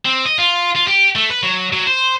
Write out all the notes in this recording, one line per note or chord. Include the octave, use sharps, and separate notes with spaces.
C4
D#5
F4
F4
G4
A3
B4
F#3
F#3
C5